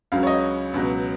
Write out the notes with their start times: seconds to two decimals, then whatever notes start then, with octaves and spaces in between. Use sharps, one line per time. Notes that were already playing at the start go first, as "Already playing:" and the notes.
0.12 C#2 C#3 F#3 F5
0.23 C#5
0.27 D#5
0.74 C#2 B2 F#3